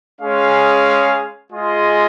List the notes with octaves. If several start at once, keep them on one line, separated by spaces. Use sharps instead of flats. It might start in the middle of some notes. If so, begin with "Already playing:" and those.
G#3 C#4 G#4 F5
G#3 F4 G#4 D#5